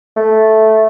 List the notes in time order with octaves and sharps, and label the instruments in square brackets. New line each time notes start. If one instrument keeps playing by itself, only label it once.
[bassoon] A3